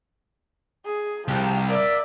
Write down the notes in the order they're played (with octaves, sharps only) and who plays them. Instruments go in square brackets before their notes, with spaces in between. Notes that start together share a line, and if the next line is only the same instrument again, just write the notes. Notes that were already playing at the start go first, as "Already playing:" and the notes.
[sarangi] G#4
[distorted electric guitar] C2 [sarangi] F3 [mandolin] G4
[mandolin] A#3 E5 [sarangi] D5